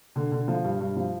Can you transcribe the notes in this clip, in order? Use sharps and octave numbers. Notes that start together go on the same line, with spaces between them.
D3
D3
F3
G2
G2
F3